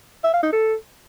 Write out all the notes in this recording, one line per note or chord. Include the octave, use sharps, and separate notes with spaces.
E5
F5
D#4
A4